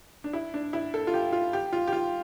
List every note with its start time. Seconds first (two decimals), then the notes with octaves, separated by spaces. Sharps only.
0.24 D4
0.33 E4
0.54 D4
0.73 E4
0.94 A4
1.07 F4
1.14 G4
1.33 F4
1.53 G4
1.73 F4
1.87 G4
1.93 F4